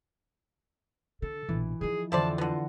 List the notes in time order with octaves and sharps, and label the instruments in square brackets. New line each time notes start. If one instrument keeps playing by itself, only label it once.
[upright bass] D3 [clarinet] A4
[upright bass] A#1 B2 [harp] E3
[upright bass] D#3 F3 [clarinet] G#4
[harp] F2 D3 E3 [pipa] E4 C5 D5 [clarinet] A5
[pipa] D3 B3 [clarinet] F4 [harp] F#5 A#6